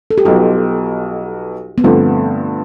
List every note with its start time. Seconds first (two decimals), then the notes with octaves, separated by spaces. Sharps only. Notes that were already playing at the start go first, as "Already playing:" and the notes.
0.11 A4
0.18 G4
0.25 B1 B2 B3 F4
1.78 B3
1.84 G2 D3 F3 A3 C4